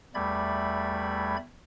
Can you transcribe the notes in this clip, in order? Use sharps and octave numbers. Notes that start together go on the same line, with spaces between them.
E2 G3 A3 D5 B5 G#6